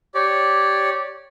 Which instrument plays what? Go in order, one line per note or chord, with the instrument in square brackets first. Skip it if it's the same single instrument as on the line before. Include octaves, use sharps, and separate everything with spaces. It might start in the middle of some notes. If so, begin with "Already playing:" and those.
[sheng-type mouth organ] G4 C#5 D5